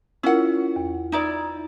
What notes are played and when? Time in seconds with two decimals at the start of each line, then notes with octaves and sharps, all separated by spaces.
0.23 C#4 E4 F4 A#4 F#5
0.76 E2
1.12 D#4 E4 D5